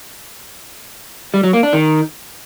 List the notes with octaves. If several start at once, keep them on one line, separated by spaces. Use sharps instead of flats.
G3
F#3
A#3
D4
D#3